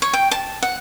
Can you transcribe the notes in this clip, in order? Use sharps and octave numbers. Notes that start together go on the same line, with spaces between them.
C#5
G5
A5
F#5